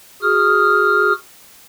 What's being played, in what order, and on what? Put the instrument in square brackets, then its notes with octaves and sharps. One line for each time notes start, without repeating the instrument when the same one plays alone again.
[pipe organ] F#4 G#4 D#6 F6